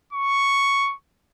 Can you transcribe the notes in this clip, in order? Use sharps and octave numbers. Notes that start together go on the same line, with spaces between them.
C#6